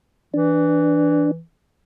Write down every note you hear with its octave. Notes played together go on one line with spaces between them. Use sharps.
E3 D4